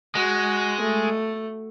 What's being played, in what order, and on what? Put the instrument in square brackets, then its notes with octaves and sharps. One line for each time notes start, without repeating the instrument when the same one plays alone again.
[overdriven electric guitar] G#3 [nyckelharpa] F#4
[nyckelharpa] A3